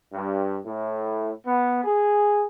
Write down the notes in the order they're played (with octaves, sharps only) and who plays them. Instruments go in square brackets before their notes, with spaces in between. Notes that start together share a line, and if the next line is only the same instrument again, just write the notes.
[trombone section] G2
A2
B3
G#4